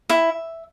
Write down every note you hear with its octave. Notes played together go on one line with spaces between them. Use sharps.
E4 E5